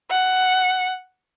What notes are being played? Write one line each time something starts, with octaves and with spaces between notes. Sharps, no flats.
F#5